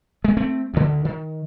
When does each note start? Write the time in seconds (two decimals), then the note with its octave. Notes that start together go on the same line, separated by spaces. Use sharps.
0.24 G#3
0.37 A3 C4
0.74 D2 D3
1.05 D#3